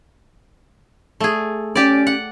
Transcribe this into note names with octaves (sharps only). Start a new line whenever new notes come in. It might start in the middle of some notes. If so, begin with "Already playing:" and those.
A3 G#4
C#4 G4 D5
F#5